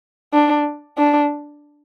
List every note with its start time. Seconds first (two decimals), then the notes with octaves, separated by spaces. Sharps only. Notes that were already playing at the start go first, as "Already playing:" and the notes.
0.33 D4
0.98 D4